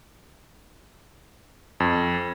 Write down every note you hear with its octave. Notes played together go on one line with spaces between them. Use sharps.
F2